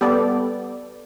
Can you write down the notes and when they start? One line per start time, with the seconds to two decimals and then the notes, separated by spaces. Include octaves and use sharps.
0.01 G3 B3 A4 D5